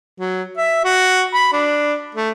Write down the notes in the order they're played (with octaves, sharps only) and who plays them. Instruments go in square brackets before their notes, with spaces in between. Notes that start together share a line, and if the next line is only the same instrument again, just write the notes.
[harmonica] F#3
E5
F#4
B5
D4
A3